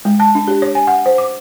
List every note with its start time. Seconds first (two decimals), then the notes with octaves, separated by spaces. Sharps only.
0.05 G#3
0.20 A5
0.35 D4
0.48 G4
0.62 C#5
0.75 G#5
0.87 F#5
1.06 C5
1.18 D6